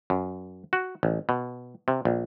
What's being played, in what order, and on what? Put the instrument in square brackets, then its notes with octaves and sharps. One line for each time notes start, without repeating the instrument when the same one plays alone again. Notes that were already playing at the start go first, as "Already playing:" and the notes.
[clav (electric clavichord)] F#2
F#4
A1
B2
C3
A#1